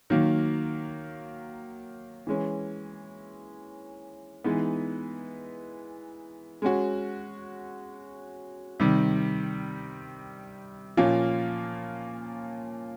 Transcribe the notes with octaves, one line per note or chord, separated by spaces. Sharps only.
D#3 F#3 A#3
E3 G#3 C#4
E3 G#3 B3 D#4
G#3 C#4 F#4
C3 D#3 G3
A#2 F3 A#3 C#4 F4